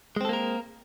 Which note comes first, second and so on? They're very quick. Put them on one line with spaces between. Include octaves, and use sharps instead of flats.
G#3 C4 A4 A#3 A#4